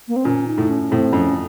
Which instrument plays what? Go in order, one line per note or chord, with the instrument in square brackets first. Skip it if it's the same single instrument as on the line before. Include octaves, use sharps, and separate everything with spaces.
[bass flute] A#3
C4
[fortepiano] A#2 [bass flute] C#4
[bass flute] D#4
[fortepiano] A2
[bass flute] C#4
[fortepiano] A2 [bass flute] C4
[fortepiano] F2 [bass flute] C#4